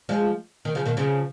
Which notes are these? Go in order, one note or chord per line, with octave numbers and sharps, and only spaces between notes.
F3 G#3
D#3
C#3 F3
B2 D#3
C#3 F3